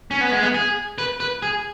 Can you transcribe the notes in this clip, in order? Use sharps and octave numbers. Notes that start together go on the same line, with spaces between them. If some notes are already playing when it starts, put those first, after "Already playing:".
C#4
B3
G#3
B3
G#4
B4
B4
G#4